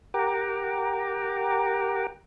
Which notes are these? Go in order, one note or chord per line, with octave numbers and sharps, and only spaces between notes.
G4 A#4 F#5 G5 A#5 D6